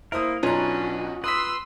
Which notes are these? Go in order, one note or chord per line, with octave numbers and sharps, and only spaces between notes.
A#3 E4 A#4 C5 D#6
B1 C#4 D4 F4 F#4 B4 C#5 A#5
B4 C6 D#6 E6 B6